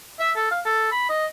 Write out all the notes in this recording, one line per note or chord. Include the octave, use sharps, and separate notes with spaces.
E5
A4
F5
A4
B5
D#5